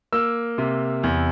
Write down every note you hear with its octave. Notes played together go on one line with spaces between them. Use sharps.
A#3 E6
C3
E2